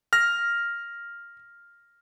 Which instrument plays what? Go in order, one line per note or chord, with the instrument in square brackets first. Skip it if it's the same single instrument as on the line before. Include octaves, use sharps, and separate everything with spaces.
[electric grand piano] F6 A#6